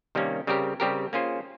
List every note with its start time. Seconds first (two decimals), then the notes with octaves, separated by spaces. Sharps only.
0.15 C3 D#3 G3 A#3 C#4
0.47 C#3 G3 C4 G4 A#4
0.80 C#3 G3 C4 G4 A#4
1.13 A#3 C#4 F4 G#4 C5